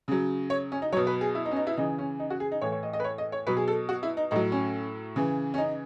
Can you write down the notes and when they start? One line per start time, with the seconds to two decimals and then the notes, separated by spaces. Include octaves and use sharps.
0.08 C#3 F#3
0.50 C#5
0.72 C#4
0.82 D#4
0.92 F#3 C#5
0.96 B2
1.07 B4
1.21 G#4
1.35 E4
1.45 D#4
1.51 C#4
1.56 D#4
1.67 E4
1.77 C#3 E3 D#4
1.99 C#4
2.20 D#4
2.30 F#4
2.40 G#4
2.52 D#4
2.61 A2 E3 C#5
2.72 C#5
2.83 D#5
2.93 D#5
3.00 B4
3.04 C#5
3.18 D#5
3.32 C#5
3.46 B2 F#3 B4
3.57 G#4
3.68 A4
3.89 F#4
4.03 E4
4.17 D#4
4.31 A2 F#3 D#4
4.52 C#4
5.16 C#3 E3
5.54 C#4
5.58 D#4